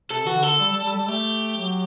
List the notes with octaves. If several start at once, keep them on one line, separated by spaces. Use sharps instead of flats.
C3 A4
E3 F#4
D3
A4
G3
G3
G3
G3
A3 G4
F#3